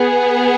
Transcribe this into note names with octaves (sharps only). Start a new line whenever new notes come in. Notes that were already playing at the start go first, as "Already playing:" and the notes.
Already playing: B3 G#4